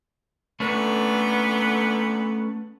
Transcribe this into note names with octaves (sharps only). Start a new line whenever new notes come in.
A#2 D3 A3 B3 C#4